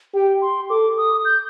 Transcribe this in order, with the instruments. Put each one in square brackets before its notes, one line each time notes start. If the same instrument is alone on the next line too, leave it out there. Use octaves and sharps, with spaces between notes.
[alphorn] G4 [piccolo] G5
[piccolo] C6
[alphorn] A4 [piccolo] D6
[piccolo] D#6
G6